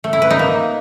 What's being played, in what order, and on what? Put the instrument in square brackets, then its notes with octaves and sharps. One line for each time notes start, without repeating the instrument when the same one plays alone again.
[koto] A3
E4
B4
D#4
A#3